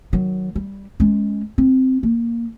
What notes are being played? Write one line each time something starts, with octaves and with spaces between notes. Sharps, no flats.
D#3 F#3
G3
G#3 C#4
C4
A#3